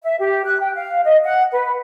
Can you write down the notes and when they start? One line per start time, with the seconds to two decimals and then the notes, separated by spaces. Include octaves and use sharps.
0.02 E5
0.18 G4
0.46 F#6
0.60 G5
0.74 F5
1.04 D#5
1.24 F#5
1.52 B4